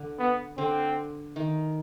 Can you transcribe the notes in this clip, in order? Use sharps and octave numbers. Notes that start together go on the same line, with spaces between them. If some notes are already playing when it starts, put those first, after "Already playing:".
Already playing: D3
B3
D3 C4
D#3